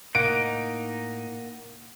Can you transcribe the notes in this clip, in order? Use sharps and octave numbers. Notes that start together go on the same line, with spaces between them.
A2 A#3 D#4 F#5 D7